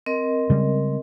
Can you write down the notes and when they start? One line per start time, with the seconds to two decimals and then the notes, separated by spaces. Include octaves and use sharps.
0.06 C4 A#4 D#5
0.50 C#3 G3 G#3